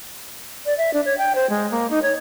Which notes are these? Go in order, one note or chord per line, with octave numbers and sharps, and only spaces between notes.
D5
E5
D4
C#5
G5
C5
G#3
A#3
D#4
C#5